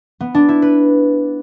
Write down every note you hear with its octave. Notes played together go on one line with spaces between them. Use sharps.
B3
D4
E4
B4